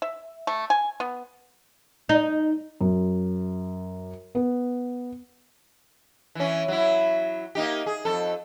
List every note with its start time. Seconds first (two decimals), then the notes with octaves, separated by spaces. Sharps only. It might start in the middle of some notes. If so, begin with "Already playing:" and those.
0.02 E5
0.47 A3
0.70 G#5
1.00 B3
2.09 D#4
2.81 F#2
4.35 B3
6.35 E3 C#4
6.68 F#3 E4
7.55 A#3 D#4 G4
7.86 G#4
8.05 F2 A4